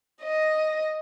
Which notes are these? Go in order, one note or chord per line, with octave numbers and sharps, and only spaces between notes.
D#5